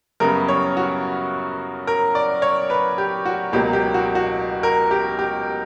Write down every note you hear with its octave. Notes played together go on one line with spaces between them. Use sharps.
F#2 C#3 G3 B3 A#4
C#5
F#4
A#4
D5
C#5
B4
G4
F#4
C#2 B2 F#3 A#3 G4
G4
F#4
F#4
A#4
G4
G4